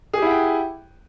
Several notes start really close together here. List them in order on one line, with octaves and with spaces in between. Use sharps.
G#4 G4 E4 F#5 G5